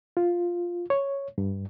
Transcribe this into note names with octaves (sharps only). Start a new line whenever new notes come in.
F4
C#5
G2